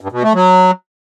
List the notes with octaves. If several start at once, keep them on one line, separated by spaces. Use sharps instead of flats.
G2
B2
A3
F#3